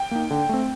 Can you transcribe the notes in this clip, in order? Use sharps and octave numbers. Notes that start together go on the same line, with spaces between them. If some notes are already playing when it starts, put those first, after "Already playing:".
Already playing: G5
A#3 D#4
D3
A3 C4